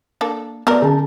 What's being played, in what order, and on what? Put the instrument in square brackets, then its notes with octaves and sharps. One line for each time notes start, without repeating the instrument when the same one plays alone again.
[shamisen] A#3 D4 A4
[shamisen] F#3 A3 A#4 [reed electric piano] B3 D5
[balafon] D3 C#4 [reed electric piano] G#4 A5